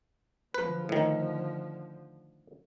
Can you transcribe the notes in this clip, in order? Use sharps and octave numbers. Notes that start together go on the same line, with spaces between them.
D3 F3 B4
A2 D#3